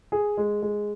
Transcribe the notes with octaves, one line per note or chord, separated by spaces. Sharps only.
G#4
G#3
G#3